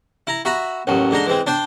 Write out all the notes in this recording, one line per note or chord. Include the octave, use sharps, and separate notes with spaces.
E4 A#5
F#4 E5 A#5 B5
A1 D#2 F#3
G#2 D3 A#5 C6
E3 G#3 C4
D4 C5 G5